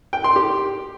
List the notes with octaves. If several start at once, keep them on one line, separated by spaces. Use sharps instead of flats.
G5
C6
G4